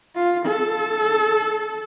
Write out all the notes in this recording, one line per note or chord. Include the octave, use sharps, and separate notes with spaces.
F4
A4